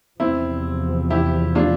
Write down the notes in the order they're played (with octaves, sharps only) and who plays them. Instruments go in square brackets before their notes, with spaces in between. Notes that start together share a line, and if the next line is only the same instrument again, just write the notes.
[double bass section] E2 C3 F3 [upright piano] C4 E4
[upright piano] E4 G4
D4 F4